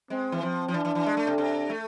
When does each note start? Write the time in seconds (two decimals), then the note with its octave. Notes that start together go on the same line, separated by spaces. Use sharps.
0.10 G#3 C4
0.32 E3
0.42 F3 C4
0.68 F3
0.74 E3 D4
0.85 E3
0.95 E3
1.06 G#3
1.17 A3
1.27 C3
1.38 C3
1.70 A3